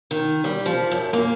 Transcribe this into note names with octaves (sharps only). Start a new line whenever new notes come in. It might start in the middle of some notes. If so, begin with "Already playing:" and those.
D#3
G3
F3
F#2
A#3